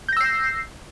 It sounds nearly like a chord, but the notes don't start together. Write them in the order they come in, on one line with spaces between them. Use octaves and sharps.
G6 A#6 E6 C7